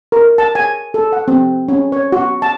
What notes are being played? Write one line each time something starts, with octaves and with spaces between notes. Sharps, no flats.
A#4
A5
G#5
A4
F#5
C4
C#4
C#5
F#4
A5